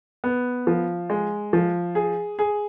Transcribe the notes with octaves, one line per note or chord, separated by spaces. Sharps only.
B3
F3
G#3
F3
G#4
G#4